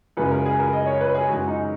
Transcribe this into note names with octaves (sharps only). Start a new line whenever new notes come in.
F#2 C#3 E3 G#3 B4
A#4
G#4
A#4
D#5
C#5
B4
G#4
F#2 E3 G#3 F#4
D#4